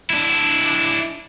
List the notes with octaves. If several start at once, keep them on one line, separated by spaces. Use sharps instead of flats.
D4 E4